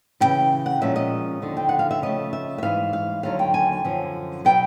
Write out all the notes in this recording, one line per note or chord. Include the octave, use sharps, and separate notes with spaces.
D#2 C#3 E3 G5
F#5
A#2 F3 G#3 C#4 E5
D#5
D#2 D3 F3
G5
F#5
F5
E5
C#3 F3 A3 D#5
E5
E5
G#2 E3 G3 F5
F5
D#2 D3 F#3 F5
G5
G#5
F#2 D3 F3
B2 F#3 B3 G5